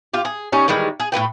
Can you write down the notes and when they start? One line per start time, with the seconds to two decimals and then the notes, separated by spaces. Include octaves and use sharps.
0.14 F4 G4
0.25 G#4
0.52 G3 C#4 D#4
0.68 D#3 E3 G3 G#3
1.00 G#4
1.12 A2 B3 B4 G5